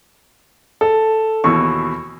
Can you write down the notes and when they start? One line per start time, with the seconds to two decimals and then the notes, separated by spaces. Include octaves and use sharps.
0.81 A4
1.44 D#2 B2 E3 C#6